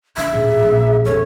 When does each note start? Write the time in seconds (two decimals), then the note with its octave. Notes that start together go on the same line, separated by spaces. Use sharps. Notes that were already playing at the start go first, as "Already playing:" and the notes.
0.17 D3 E5
0.33 D#1 A2 G#4
0.63 A#1 C#3
1.05 E1 C#3 A4 C#5